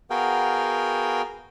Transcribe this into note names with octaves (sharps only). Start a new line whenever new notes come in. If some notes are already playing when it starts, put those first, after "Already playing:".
B3 F#4 G#4 A#4 F5 G5